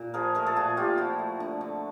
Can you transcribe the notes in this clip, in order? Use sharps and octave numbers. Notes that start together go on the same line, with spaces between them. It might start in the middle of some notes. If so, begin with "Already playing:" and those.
Already playing: A#2
F3 G#4 A#4
A3 G#4 A#4
A4
A#2 F#4 G#4
A#2 F4 G4
F3 E4 F#4
A3
D3
D3